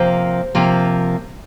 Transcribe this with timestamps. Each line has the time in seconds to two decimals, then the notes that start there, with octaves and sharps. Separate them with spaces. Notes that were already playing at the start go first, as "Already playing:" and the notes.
Already playing: C3 F3 A#3 C5
0.55 C3 F3 A#3